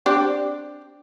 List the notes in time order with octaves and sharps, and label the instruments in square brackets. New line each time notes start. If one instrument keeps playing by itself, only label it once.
[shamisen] C4 D4 G4